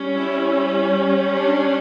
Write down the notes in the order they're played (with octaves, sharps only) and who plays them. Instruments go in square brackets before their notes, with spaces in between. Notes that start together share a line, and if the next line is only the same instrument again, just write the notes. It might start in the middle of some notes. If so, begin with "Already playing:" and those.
Already playing: [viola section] G3 C#4
E4
D4